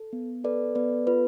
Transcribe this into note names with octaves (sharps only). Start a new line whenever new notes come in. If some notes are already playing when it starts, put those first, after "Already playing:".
Already playing: A4
B3
A4 B4 D5
B3 B4 D5
F4 B4